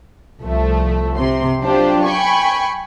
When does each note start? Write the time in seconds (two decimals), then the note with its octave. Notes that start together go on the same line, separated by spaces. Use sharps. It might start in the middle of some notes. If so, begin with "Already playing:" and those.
0.41 C2 F3 A3
1.18 C3 C6
1.61 F#3 D4 F4 G4 C5
2.05 G5 G#5 B5 C#6